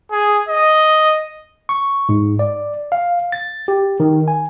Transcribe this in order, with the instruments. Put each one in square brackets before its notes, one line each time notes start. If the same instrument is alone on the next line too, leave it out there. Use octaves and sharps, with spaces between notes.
[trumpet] G#4
D#5
[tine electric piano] C#6
G#2
D5
F5
A6
G4
D#3
G#5